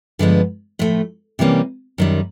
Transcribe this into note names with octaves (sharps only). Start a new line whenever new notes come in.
G2 D3 F3 G#3 B3
A2 F3 A3
C3 E3 G3 A#3 C#4
F#2 D#3 G3